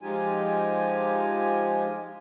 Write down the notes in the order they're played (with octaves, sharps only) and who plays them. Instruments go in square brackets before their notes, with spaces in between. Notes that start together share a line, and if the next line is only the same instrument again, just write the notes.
[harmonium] F3 G#3 D#4 F4 G4 G#5